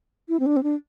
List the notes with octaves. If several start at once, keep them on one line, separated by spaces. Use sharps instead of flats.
E4
C4
D4
C4
D4